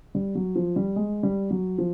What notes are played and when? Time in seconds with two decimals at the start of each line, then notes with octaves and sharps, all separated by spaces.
0.15 G3
0.35 F#3
0.56 F3
0.76 G3
0.96 G#3
1.23 G3
1.51 F#3
1.78 F3